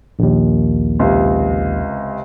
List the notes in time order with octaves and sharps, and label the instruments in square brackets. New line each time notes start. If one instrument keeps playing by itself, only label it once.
[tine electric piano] A#1 D#2
[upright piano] C#2 C3